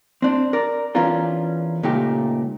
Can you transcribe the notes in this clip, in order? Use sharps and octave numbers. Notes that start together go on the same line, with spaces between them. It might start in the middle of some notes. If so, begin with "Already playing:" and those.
C4 D4
A#4 D5
E2 B3 C#4 D4 F4 A#4
C#2 A#2 A3 D#4 G4